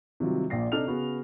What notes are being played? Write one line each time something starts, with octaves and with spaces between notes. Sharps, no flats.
C3 D#3 F#3 G3 F4
A#1 A#2 D5 A#6 C7
C3 D4 D#4 A4 F6 F7
C#3 B3 F#4